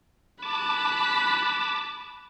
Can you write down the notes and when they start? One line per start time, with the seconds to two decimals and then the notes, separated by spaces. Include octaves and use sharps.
0.42 A5 B5 D6 F#6